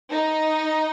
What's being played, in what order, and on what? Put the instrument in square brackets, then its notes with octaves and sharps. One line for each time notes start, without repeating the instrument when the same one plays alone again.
[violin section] D#4